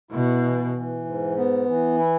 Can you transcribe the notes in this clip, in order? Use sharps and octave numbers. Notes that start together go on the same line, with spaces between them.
B2 E4
E3
E3
G#2
B3
E3
E4